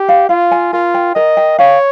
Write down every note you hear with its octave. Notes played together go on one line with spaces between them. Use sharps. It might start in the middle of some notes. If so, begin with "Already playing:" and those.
Already playing: G4
F5
F4 F5
G#5
F4 A#4
G5
A#4 D#5
G5
C#5 F5